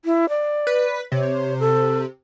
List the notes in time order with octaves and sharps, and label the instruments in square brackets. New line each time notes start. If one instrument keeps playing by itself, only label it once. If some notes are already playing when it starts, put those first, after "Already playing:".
[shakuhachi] E4
D5
[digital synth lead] B4
[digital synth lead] C3 [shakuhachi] C#5
[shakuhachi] A4